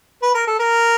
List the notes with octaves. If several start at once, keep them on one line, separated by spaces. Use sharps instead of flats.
B4
A#4
A4
A#4